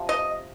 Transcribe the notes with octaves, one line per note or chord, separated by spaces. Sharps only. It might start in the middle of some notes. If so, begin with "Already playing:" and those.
Already playing: C3 F3
D#5